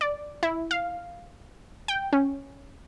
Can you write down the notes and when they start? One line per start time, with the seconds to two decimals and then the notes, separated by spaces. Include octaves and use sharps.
0.01 D5
0.43 E4
0.71 F5
1.88 G5
2.13 C#4